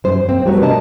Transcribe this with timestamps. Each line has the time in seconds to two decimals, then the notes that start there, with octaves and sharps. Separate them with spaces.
0.04 F#2 C5
0.29 A#3 C4
0.45 G3 A3 B3 F#4 A#4 C#5
0.62 C3 D4 A#4 D#5 A5